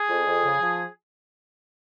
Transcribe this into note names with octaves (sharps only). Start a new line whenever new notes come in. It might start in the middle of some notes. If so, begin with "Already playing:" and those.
Already playing: G#4
F2
F2
C#3
F3